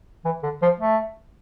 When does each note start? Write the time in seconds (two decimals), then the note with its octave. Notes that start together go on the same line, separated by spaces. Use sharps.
0.25 E3
0.43 D3
0.62 F3
0.80 A3